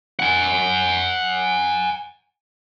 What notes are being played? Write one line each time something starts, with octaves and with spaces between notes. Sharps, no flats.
F#5 G#5